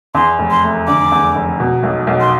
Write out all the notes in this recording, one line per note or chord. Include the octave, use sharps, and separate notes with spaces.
E2 C6
F1
C6
A3
D3 D6
E2
F1
B2
B1
B1
C6